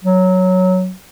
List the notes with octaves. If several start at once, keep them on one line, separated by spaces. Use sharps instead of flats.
F#3